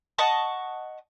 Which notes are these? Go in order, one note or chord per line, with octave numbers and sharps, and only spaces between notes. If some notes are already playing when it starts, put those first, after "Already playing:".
D#5 F#5 A5 C#6